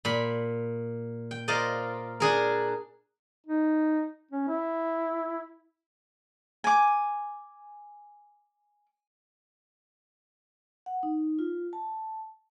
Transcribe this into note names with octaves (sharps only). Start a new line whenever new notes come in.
A#2 B5
G5
F4 A#4 C5 D5 D#5
D4 G#4 A#4
D#4
C#4
E4
G#5 D6
F#5
D#4
F4
A5